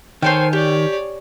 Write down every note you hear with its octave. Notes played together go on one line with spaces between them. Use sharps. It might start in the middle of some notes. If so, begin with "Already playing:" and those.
D#3 A4 C5 C#5 G5 G#5
G4 C#5 D5